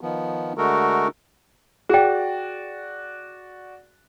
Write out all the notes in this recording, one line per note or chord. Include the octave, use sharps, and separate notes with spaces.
D#3 F3 B3
D3 G#3 A3 F#4 A4 A#4
F#4 G#4 D5 G5